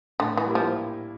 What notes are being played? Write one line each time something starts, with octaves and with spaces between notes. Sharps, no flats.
A2 D3
E3
G3 A#3 E4
F3